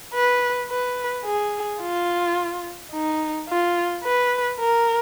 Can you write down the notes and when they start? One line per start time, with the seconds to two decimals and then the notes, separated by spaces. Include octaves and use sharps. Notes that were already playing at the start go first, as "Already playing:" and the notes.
0.14 B4
0.70 B4
1.25 G#4
1.81 F4
2.92 D#4
3.49 F4
4.04 B4
4.59 A#4